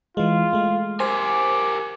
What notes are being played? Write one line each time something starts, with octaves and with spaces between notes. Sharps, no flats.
E3 G#3 F4
G#3 A3
G4 A#4 C5 G#5 D6